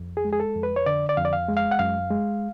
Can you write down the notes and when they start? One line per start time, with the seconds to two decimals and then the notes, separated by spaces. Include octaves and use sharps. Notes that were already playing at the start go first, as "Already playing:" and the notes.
Already playing: F2
0.17 G#4
0.25 G#3
0.33 G#4
0.40 A4
0.56 F2
0.63 B4
0.76 C#5
0.86 D3 D5
1.09 D5
1.17 F2 F5
1.25 D5
1.33 F5
1.48 G#3
1.57 F5
1.71 F#5
1.79 F#2 F5
2.11 G#3